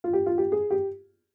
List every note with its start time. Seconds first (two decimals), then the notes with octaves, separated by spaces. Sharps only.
0.04 F4
0.13 G4
0.26 F4
0.38 G4
0.52 G#4
0.71 G4